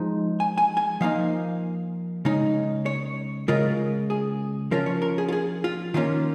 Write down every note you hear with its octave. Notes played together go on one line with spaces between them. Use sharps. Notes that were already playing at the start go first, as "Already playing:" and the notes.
Already playing: F3 G#3 D#4
G#5
G#5
G#5
F3 A#3 D#4 F5
C#3 G#3 D#4
C#5
C#3 G#3 F4 A#4
G#4
F3 C#4 F4 A#4
C#5
A#4
G#4
F4
G#4
F4
D#3 A#3 C#4 F4